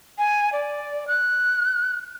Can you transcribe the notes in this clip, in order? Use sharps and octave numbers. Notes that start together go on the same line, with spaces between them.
G#5
D5
F#6